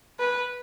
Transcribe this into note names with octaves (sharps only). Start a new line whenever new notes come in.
B4